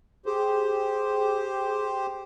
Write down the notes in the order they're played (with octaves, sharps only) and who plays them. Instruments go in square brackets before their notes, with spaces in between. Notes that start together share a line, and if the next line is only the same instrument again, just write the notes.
[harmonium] G4 C5 [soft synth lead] G#4